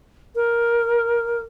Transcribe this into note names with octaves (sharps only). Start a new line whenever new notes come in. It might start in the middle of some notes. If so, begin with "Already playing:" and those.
A#4